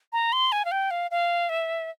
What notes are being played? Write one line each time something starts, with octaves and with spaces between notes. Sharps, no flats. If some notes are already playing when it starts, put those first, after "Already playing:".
A#5
C6
G#5
F5
G5
F5
F5
E5